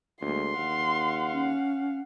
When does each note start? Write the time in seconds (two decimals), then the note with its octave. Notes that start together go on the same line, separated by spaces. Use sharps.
0.22 D2 G#3 A#3 C6
0.58 D#2 F5 F#5
1.33 C#4